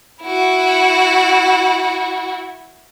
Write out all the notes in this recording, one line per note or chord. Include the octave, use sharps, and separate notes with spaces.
E4 F#4